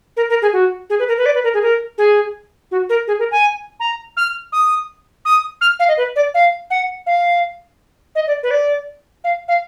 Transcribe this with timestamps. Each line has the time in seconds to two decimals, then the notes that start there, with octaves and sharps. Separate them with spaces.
0.17 A#4
0.30 A#4
0.42 G#4
0.53 F#4
0.90 G#4
0.99 B4
1.08 A#4
1.18 B4
1.26 D5
1.35 B4
1.44 A#4
1.54 G#4
1.62 A#4
1.98 G#4
2.71 F#4
2.89 A#4
3.08 G#4
3.19 A#4
3.31 G#5
3.80 A#5
4.17 F6
4.52 D#6
5.25 D#6
5.61 F6
5.80 F5
5.88 D#5
5.97 B4
6.16 D5
6.34 F5
6.70 F#5
7.06 F5
8.15 D#5
8.27 D5
8.43 B4
8.51 D5
9.24 F5
9.48 F5